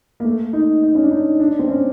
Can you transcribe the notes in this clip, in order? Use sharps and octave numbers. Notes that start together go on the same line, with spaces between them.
A#3
A3
D#4
D#4
C#4
D4
D#4
D4
C4
C#4